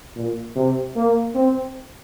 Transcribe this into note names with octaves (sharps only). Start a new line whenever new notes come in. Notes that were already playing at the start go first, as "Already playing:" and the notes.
A#2
C3
A#3
C4